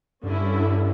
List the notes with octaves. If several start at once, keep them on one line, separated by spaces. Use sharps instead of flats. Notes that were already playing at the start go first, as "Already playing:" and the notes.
G2 D3 C#4 E4